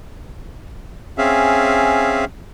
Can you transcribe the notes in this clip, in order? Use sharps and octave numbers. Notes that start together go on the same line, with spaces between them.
C4 C#4 G#4 E5 F5